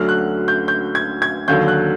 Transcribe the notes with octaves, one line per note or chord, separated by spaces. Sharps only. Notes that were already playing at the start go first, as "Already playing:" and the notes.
Already playing: D2 D3 F#3 F6
F#6
G6
G6
G#6
G#6
D#2 D3 F#3 G6
F#6